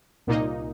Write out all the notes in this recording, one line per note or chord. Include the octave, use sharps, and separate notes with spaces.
C2 A#2 A#3 D#4